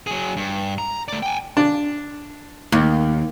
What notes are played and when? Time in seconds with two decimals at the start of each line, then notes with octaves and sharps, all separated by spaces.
0.07 F#3 G#4
0.37 G2
0.78 A#5
1.08 A3 D5
1.23 G5 G#5
1.57 D4
2.72 D#2